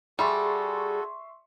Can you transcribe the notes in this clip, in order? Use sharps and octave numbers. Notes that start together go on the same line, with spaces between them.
G3 F#4 G#4 A4 E5 C6 C#6